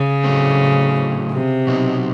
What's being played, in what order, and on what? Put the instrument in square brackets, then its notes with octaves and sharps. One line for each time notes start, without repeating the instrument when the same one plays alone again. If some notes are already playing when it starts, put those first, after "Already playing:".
Already playing: [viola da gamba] C#3
[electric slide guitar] A2 F#3 A3 C4
[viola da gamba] C3
[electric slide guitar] B2 F#3 B3 D#4